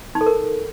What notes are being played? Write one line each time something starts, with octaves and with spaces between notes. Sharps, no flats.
D#4
A4
A#4